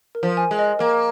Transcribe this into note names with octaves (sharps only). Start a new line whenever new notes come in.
A#4
F3
G#5
G#3
D#5
A#3 A#4